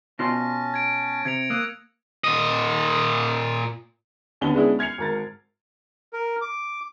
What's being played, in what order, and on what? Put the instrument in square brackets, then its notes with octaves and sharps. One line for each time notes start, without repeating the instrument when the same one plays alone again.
[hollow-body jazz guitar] B2 F4 C6 [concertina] C#4 A5 [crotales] A#6
[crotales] G#6 D7
[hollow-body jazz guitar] C3 [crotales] G#6 C#7 F7
[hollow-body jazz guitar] A#3 [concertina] D#6 E6 F#6
[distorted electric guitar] A#2 D#5
[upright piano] D#2 D3 B3 C#4 G4 G7
G#3 B3 C#4 D4 E4 G#4
F6 G#6 C7 C#7 F7
G#1 A#4 A6
[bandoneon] A#4
D6